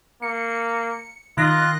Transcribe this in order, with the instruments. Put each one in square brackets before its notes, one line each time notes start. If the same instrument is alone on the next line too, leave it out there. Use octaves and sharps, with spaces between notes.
[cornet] A#3 [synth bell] C#7
[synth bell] D#3 F#6 A#6 [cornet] F4